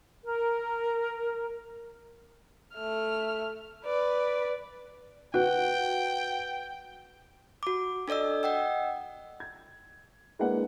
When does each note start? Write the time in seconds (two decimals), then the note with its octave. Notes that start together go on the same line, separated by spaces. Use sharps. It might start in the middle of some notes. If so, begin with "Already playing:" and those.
0.23 A#4
2.74 A3 F6
3.85 B4 D5
5.34 F#4 B4 F#5 G5 F#6
7.63 F#4 D6
8.08 D4 A4 D5 D#5 E6
8.43 D#5 F#5 G5 E6
9.40 G#6
10.39 G#3 A#3 D4 E4 B4 F#5